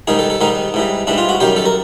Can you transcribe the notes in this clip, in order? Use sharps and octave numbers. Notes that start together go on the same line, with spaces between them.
G#2 D#3 G3 G#4
A4
A4
G#2 D#3 G3 D#4
G#2 E3 G3
G#2 E3 G3 D4
F4
F#4
F#2 D#3 G3 G4
A4
A#4